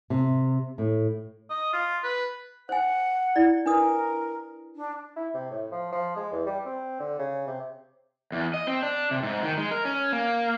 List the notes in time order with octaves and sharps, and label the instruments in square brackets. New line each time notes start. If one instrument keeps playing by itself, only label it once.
[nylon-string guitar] C3
A2
[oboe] D#5
F4
B4
[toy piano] C5 G#5 [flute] F#5
[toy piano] E4 D5
[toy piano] D4 B4 D#6 [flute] A#4
[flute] D4
[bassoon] E4
C3
A2
F3
F3
G#3
E2
G3
C4
D3
C#3
C3
[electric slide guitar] E2
D#5
C4
D4
C3
G#2
D#3
G#3
A#4
C#4
A#3